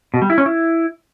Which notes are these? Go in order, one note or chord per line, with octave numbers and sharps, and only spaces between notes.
B2
G3
E4
C#4
E4